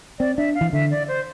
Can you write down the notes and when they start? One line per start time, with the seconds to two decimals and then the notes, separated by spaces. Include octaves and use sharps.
0.19 C4 D5
0.38 D4 E5
0.55 F5
0.61 E3
0.73 D3 E5
0.91 D5
1.08 C5